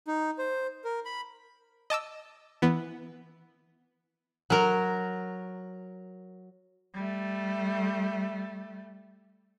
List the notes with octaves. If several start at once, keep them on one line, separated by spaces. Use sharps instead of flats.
D#4
C5
A#4
B5
D#5 A5 D6 E6
E3 B3
F#3 A#4
G3 A3